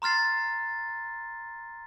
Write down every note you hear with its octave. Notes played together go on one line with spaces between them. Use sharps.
A#5 C6 F6 A6 C7